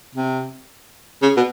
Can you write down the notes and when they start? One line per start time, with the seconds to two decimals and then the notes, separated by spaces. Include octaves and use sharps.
0.15 C3
1.22 C#3
1.37 B2